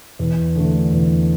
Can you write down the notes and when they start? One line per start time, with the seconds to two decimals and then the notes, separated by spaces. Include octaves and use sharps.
0.19 E2
0.56 D3 A3
0.92 E2